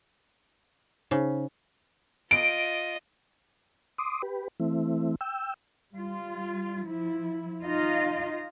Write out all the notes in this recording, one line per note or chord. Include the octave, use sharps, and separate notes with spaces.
C#3 D#4 C5
F4 D#5 D7
C6 D6 D#6
G4 B4
E3 A3 C4 E4
G5 E6
G3 F4
F3 E4
D#4 F4 D#5 F5